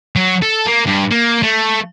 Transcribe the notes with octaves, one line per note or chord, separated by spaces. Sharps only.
F#3
A4
A#3
G2
A#3
A3